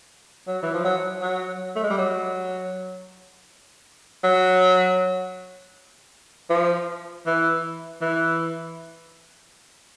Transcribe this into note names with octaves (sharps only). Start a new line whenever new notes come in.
F#3
E3
F3
F#3
F#3
A3
G#3
G3
F#3
F#3
F3
E3
E3